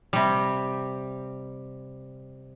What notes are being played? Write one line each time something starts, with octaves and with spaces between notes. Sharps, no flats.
C3 G3